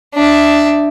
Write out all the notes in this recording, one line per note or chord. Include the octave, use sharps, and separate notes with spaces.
D4 E5